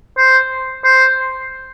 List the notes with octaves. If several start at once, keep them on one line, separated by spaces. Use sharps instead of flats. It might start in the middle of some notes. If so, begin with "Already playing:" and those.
C5
C5